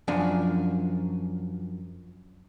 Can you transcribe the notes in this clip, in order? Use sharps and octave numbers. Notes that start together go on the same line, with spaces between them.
F#2 F3 D4 G#5